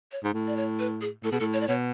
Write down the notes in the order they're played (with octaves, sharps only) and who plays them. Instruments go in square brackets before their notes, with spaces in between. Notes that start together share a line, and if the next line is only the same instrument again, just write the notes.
[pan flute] C#5
[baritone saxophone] G#2
A2
[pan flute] D5
C#5
B4
G#4
[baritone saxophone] A2 [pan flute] A4
[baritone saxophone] B2 [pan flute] G#4
[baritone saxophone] A2 [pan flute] A4
[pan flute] C#5
D5
[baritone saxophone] B2 [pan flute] C#5